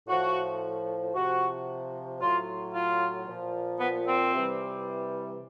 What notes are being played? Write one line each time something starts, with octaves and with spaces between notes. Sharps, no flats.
A2 F3 F#4
C3 F3 F#4
A2 F#3 F4
F4
A#2 F3
B3
C4
C3 E3 G3